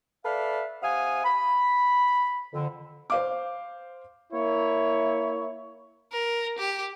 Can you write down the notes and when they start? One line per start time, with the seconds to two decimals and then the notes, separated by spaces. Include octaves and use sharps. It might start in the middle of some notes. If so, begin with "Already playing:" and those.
0.24 A4 B4 D5 E5 F5
0.82 C3 F5 F#5 G#5 D#6
1.25 B5
2.53 F2 D3
3.10 C5 F5 D6
4.33 A#3 E4 C#5
6.12 A#4
6.58 G4